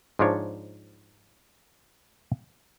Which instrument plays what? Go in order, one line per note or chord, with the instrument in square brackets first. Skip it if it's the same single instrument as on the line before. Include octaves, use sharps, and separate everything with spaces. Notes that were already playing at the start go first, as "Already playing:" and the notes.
[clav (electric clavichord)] G#2 F3 D4 C#5